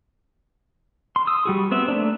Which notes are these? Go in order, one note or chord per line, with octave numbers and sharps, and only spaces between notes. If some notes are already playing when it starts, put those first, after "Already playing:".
C6
D#6 E6
G3 F#4 G#4
B3 C4 E5
A3 A#3 D4